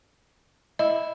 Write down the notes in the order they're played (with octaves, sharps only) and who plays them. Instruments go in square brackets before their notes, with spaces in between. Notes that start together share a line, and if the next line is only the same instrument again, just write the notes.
[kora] E4 [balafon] D#5